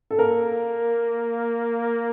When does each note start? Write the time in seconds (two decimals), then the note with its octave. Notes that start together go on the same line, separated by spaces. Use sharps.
0.11 A4
0.19 A#3 A#4